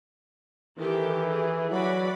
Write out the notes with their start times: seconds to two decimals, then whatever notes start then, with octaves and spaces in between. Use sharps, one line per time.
0.79 D#3 E3 G4 A4
1.30 G#4
1.71 F#3 F#4 D5 B5